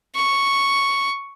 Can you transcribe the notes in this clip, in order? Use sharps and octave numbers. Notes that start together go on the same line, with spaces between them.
C#6